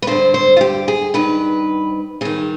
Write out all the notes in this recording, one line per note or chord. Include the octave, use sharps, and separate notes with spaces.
B4
G2 D3 C5
C5
F4
G4
G#4
G2 D#3 B4
G2 D#3 G#4